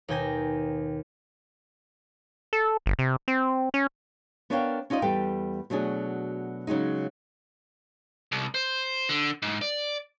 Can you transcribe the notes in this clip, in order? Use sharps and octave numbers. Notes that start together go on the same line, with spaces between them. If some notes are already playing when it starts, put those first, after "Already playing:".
D#2 B2 G5 G#5 A#6
A4
G1
C3
C4
C#4
B3 D4 A#4 C#5 F5 G5
C#4 D#4 F4 D5 D#5
E2 G3 A4 B4 G5
B2 F#3 A3 D4 G#4
C#3 F#3 G#3 D#4
C2
C5
D3
G#2
D5